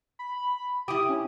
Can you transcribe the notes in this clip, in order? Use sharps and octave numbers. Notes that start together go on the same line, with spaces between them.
B5
E4 G4 D#6
C#4